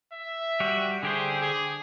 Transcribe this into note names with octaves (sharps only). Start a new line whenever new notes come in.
E5
G3 F#4
D3 G4 G#4 C5
G#4